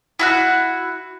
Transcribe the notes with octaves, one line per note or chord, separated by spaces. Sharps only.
E4 F#4 F#6